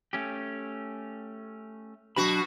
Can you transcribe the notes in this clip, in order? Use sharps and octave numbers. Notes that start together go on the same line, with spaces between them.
A3 C#4 G4
B2 F#3 D4 F#4 B5